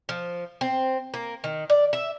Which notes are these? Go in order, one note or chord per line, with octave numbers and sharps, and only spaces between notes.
F3
C4
A#3
D#3
D5
E5